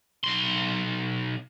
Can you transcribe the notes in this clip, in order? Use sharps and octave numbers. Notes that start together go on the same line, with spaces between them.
B1 C6